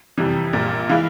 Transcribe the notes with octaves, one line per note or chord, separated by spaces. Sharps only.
F2 C3 E3 G3
A#1 A#2 G3
E3 G#3 E4 F5